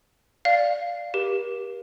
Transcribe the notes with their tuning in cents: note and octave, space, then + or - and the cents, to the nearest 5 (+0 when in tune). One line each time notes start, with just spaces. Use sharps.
D5 +0 F5 +0
G4 +0 A#4 +40